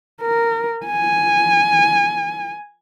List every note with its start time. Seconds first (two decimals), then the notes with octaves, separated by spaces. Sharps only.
0.21 A#4
0.86 G#5